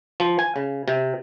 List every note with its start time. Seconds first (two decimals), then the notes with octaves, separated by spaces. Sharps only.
0.20 F3
0.39 G#5
0.56 C#3
0.88 C3